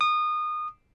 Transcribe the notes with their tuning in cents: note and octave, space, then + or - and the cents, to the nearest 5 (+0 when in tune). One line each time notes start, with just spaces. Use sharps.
D#6 -25